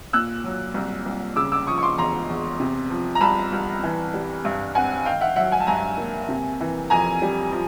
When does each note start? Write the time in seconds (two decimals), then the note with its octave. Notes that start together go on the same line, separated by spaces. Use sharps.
0.13 A#2 E6 F#6
0.44 F#3
0.74 C2
1.06 C2
1.36 C#3 D6 E6
1.52 D6 E6
1.67 F3 C#6 D#6
1.78 C#6
1.83 C6 D6
1.98 E2 A#5 C6
2.29 E2
2.60 C3
2.90 F3
3.15 A#5
3.21 C2 A5 B5
3.52 C2
3.83 E3
4.14 G3
4.45 G2
4.75 C4 F#5 G#5
5.05 D#3 F5 G5
5.21 E5 F#5
5.36 F#3 E5 F#5
5.52 F#5 G#5
5.60 A5
5.67 G2 G#5 A#5
5.98 A#3
6.29 C3
6.60 E3
6.90 F2 G#5 A#5
7.22 G3
7.52 F3